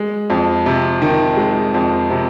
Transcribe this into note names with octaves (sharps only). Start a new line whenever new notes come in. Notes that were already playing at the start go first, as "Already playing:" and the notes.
Already playing: G#3
F2
C3
D#3
G#3
F2
C3